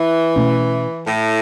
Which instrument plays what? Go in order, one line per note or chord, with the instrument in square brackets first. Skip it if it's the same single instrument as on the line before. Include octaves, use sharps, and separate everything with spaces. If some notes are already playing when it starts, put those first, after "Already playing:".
Already playing: [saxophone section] E3
[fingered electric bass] B2 A3 C#4
[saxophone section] A2